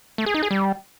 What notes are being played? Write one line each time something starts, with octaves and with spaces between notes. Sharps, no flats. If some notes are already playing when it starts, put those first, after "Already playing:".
A3
G#4
D#4
G#4
G3